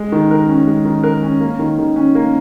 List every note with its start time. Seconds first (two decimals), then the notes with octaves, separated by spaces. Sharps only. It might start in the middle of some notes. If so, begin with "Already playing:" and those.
Already playing: G#3
0.12 D#3
0.31 A#4
0.49 C#4
0.67 G#3
0.85 D#3
1.04 A#4
1.23 C#4
1.41 A#3
1.59 D#3
1.78 D#3
1.96 C#4
2.15 A#3